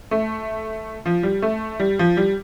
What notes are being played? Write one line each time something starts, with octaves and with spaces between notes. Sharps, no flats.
A3
F3
G3
A3
G3
F3
G3